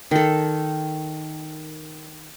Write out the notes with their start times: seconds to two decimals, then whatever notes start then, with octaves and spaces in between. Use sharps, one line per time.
0.11 D#3 A4